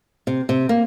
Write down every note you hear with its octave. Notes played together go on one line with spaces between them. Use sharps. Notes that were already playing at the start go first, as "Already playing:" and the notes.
C3
C3
A#3